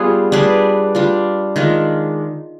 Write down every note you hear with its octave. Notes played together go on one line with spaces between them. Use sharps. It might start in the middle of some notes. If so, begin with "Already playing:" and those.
Already playing: G3 B3 F4 G#4
G3 D4 G#4 B4
G3 D4 F4
D#3 G#3 D4 F4